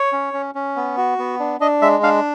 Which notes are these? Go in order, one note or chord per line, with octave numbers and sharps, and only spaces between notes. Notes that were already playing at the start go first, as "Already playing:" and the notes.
Already playing: C#5
C#4
C#4
C#4
B3
F#4
B3
D4
D4 D#5
G#3 E5
D4 F5